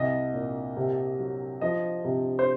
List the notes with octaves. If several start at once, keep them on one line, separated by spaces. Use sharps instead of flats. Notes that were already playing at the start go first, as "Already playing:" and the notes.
Already playing: C2 D#5
A#2
C3
F#3
F3 D#5
C3
C5